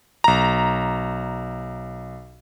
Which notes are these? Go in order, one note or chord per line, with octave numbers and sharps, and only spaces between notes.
B1 A#5